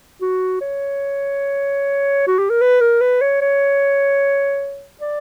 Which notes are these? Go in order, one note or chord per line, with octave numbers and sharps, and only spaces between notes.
F#4
C#5
F#4
G4
A#4
B4
A#4
B4
C#5
C#5
D5